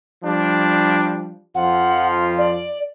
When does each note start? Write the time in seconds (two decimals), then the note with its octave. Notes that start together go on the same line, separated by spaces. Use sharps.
0.23 F3 G3 D4
1.55 F2 F3 F4 F#5
2.38 D5